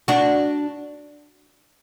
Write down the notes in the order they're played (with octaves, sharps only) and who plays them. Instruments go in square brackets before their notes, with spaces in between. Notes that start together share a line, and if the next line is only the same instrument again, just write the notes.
[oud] D4 F#4